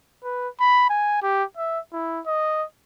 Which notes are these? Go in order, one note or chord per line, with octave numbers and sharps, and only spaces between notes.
B4
B5
G#5
G4
E5
E4
D#5